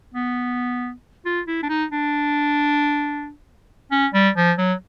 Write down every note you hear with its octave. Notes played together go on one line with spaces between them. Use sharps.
B3
F4
E4
D4
D#4
D4
C#4
G3
F3
F#3